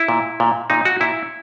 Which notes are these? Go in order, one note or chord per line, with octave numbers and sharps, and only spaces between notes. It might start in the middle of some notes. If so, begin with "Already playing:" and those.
Already playing: E4
A#2
A#2
A#2 D#4
F#4
A#2 E4